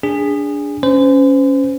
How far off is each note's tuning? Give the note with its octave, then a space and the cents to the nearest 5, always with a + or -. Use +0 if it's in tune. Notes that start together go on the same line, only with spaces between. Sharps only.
D4 -15 G#4 -20
C#4 +0 C5 -35